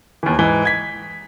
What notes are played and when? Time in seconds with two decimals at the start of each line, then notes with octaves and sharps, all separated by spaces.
0.23 D#2 E3
0.39 G#2 E3 G7
0.65 G#6 B6